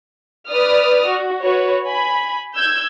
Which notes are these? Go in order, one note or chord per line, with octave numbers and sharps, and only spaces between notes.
B4 D5 D#6 F6
F#4
F#4 B4 C#5
G#5 B5
E6 G6 G#6